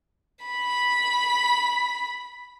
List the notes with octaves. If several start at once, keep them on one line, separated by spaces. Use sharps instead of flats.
B5 B6